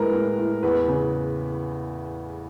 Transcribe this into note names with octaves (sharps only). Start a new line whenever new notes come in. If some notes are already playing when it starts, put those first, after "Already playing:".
Already playing: A2 G#3 A#4 B4
A2
A2
E2 B4
C#3